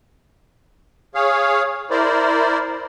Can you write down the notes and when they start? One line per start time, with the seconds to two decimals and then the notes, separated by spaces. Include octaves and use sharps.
1.15 G#4 C#5 F5
1.91 E4 A#4 C5 D5